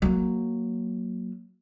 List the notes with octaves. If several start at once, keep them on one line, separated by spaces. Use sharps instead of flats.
F#3 A#3